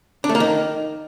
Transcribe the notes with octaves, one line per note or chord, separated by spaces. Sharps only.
D4
A3
A#3
D#3